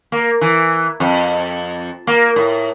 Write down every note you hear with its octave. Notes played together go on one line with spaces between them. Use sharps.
A#3
E3
F2
A#3
A2